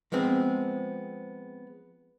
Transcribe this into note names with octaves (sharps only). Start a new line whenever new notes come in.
F3 G#3 B3 C4